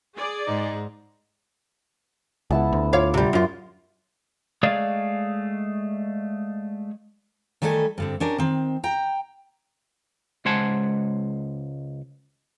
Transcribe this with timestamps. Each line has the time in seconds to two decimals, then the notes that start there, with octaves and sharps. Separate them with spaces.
0.16 G#4 D5
0.47 G#2 D#4
2.50 C#2 B3 E4 A5
2.73 D2
2.93 F4 C#5 F5 D6
3.14 C3 G3
3.33 F#2 F4
4.63 G#3 A3 G#4 C#5 D5 F5
7.62 D#3 G3 A3 A4 A#4 G#5
7.98 G2 D3 C4
8.20 C#4 D4 G4 A#4
8.38 D#3 C4
8.84 G5 A#5
10.45 C#2 G#3 C5 F#5 G#5 A5